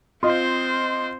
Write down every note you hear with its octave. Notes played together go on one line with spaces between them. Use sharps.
C4 F4 C5 D#5